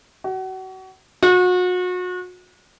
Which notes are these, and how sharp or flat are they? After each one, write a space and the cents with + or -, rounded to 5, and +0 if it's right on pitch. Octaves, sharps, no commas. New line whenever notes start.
F#4 +30
F#4 -35